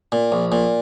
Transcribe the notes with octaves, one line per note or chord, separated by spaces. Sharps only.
A#2
A#1
A#2